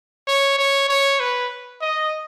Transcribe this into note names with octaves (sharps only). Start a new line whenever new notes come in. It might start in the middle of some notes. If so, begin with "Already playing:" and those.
C#5
C#5
C#5
B4
D#5